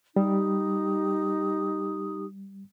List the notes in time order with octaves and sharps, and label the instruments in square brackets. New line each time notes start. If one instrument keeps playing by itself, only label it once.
[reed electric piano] G3 [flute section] D#4 G4 D#6